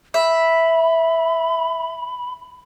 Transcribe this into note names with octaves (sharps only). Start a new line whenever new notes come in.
E5 B5